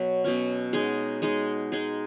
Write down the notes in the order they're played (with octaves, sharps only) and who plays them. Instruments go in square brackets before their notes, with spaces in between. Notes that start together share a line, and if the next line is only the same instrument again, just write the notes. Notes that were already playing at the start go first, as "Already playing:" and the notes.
Already playing: [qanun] B2 F#3
B2 F#3 C#4
G#3 D#4 G#4
G#3 D#4 G#4
G#3 D#4 G#4